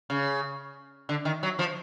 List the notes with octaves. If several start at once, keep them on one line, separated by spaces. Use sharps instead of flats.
C#3
D3
D#3
F#3
F3